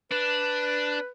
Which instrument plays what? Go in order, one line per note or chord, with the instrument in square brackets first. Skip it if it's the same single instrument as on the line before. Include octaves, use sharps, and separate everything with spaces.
[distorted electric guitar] D4 [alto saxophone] B4